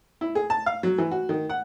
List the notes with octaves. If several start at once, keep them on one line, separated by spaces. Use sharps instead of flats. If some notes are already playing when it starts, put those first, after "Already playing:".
E4
G#4
A5
F5
F#3
E3
F#4
D#3
F#5